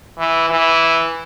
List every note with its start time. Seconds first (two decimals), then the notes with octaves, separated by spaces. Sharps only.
0.19 E3
0.50 E3